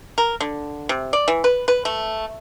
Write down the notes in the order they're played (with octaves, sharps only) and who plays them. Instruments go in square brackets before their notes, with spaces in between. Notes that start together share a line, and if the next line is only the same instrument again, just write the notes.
[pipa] A#4
D3
C3
D5
E3
B4
B4
A3